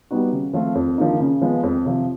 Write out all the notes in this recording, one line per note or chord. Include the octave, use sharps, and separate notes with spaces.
G3 B3 D#4 F#4
C#3
F3 A3 C4 F4
F2
D3 F3 A#3 D#4
C#3
F3 G#3 B3
F2
C3 F3